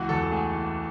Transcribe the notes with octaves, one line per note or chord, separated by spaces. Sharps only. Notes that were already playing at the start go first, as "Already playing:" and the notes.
Already playing: C#2 E3 F#4
E2 A4
A4
A3 G#4
E3